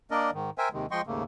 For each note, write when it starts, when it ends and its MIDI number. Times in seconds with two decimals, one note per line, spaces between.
0.11 0.31 58
0.11 0.31 62
0.11 0.31 70
0.11 0.31 74
0.11 0.31 75
0.33 0.50 44
0.33 0.50 51
0.58 0.69 70
0.58 0.69 72
0.58 0.69 76
0.58 0.69 79
0.58 0.69 80
0.73 0.86 39
0.73 0.86 48
0.73 0.86 51
0.73 0.86 56
0.91 1.01 53
0.91 1.01 56
0.91 1.01 75
0.91 1.01 79
0.91 1.01 84
0.91 1.01 85
1.07 1.23 39
1.07 1.23 44
1.07 1.23 49
1.07 1.23 57
1.07 1.23 58